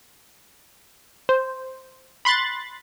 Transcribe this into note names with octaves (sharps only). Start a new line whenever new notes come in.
C5
B5 C6 F#6 A6